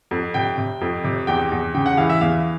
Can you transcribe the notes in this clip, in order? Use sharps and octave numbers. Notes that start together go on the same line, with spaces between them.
F2
C3 G5
C3
F2
C3
E2 G5
E2
C#3 G5
F#5
E3 F5
E5
E2 F5